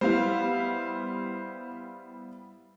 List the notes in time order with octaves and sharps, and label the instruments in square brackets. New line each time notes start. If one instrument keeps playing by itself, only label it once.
[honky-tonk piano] G3 B3 E4 [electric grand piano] C5 F5